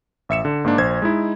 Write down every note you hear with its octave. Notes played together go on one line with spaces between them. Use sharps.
A1 E5 C#7 E7
D3
G#2 A#3 D4
A#1 C5 G#6
G#3 D#4 E4